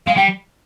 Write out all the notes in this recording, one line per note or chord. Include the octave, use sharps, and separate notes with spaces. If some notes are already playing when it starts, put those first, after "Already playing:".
G#3 F5
G3 G5